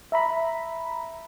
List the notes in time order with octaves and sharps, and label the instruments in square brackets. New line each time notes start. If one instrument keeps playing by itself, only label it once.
[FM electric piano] E5 A#5 B5